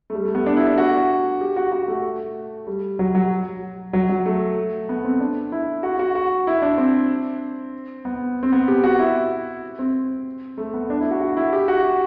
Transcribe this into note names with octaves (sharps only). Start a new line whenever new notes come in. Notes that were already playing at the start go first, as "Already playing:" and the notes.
A3
G3
A3
B3
D4
E4
D4
F#4
G4
F#4
F#4
A3
G3
F#3
F#3
F#3
F#3
A3
B3
C4
D4
E4
F#4
F#4
F#4
E4
D4
C4
B3
C4
B3
G4
F#4
E4
C4
A3
B3
D4
E4
F#4
F#4
E4
G4
F#4